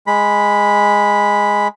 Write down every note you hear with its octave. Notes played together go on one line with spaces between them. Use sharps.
G#3 B5